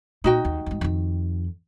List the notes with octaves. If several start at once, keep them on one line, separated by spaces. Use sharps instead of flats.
A#2 D#4 F#4 G5
D#2
F2 G#2
F2 D#3